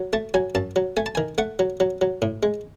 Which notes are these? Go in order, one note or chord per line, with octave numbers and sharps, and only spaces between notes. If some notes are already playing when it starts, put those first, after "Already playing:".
Already playing: F#3
A3 A5
F#3 G#5
F#2 A5
F#3
A3 G#5
A5
D#3 G#5
A3 F#5
F#3
F#3
F#3
A2
G#3